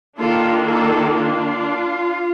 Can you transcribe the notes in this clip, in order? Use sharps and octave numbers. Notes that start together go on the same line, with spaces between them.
D#3 A#3 D4 F4 A4
F4 A4
D4 F4